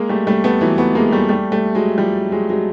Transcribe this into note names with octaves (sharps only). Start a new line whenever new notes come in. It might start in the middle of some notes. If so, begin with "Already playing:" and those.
Already playing: G#3 A#3
G3 A3
G3 A3
A3 B3
E3 F#3
A3 B3
G#3 A#3
G3 A3
G3 A3
G3 A3
F#3 G#3
F3 G3
F#3 G#3
F#3 G#3